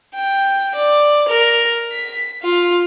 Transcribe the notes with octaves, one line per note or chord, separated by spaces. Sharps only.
G5
D5
A#4
B6
F4